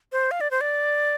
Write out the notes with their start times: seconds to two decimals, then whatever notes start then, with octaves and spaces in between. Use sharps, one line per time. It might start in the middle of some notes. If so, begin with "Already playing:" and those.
0.12 C5
0.31 F5
0.41 D5
0.51 C5
0.61 D5